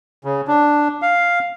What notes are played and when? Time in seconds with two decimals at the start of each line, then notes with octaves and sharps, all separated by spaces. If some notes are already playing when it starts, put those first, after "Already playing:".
0.24 C#3
0.48 D4
1.02 F5